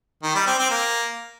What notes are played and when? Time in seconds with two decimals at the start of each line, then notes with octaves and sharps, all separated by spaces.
0.23 D#3
0.35 G3
0.47 C4
0.59 C4
0.70 A#3